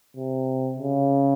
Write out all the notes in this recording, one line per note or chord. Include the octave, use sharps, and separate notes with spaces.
C3
C#3